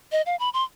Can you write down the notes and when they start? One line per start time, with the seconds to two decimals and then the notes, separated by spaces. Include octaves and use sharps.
0.12 D#5
0.26 F5
0.40 B5
0.54 C6